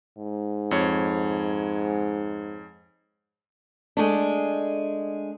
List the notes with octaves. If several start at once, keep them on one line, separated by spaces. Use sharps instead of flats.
G#2
F2 C#5
G#3 A3 D4